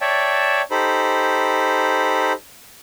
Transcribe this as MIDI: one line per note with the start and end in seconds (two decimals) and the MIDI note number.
0.01 0.62 73
0.01 0.62 74
0.01 0.62 76
0.01 0.62 79
0.01 0.62 81
0.71 2.33 63
0.71 2.33 67
0.71 2.33 69
0.71 2.33 72
0.71 2.33 83